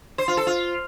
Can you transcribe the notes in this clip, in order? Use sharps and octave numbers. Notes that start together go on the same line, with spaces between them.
C5
F4
A4
F4